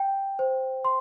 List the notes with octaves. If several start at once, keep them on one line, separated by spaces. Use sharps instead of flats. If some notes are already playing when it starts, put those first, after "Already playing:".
Already playing: G5
C5
C6